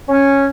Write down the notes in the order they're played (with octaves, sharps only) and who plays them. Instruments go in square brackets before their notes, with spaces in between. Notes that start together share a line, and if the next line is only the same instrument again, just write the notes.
[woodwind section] C#4